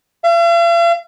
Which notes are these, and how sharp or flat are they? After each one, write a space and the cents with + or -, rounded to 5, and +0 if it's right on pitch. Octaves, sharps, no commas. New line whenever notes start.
F5 -45